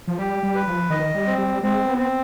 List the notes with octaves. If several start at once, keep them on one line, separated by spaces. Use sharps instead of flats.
F3
G3 G4
G3
B4
F3
D#3 D#5
G3
C4
G3
G#3 C4
B3
C4